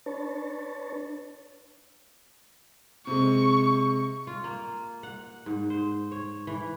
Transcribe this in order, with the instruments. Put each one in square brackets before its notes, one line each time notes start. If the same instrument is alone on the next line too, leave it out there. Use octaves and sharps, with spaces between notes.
[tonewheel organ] D4 B4 C#5 A5
[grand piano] C3 G#3 [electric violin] C#6
[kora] F4
A#3
F#5
G#2
C5
C#5
E3